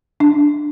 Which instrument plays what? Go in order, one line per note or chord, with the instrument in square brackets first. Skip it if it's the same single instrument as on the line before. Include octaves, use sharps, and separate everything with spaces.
[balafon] D4